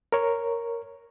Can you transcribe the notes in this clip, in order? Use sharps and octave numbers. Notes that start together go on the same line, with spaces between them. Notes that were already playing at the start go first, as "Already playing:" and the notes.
A#4 C#5